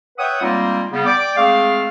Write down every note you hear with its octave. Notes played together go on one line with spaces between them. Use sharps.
B4 C#5 E5 F#5 G5 D#6
G3 G#3 A#3 C4 D#4 F4
C#3 G3 B3
D5 G5 D6
G#3 A3 C4 G#4 F5